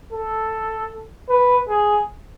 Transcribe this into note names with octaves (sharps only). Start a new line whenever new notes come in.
A4
B4
G#4